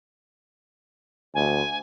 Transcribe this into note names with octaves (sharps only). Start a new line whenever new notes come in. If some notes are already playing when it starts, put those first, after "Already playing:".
D2 G#5